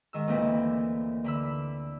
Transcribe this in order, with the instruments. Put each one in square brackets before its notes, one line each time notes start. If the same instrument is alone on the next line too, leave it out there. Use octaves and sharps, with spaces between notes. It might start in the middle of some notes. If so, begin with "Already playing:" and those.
[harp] G#2 D#3 E6
D2 A#2 E3 A#3 C4 B4
D3 B5 E6